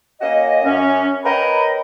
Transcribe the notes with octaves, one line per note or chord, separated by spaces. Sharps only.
A#3 C#4 F#4 D#5
F#2 C#4
A#4 B4 C#5 D#5 G5 B5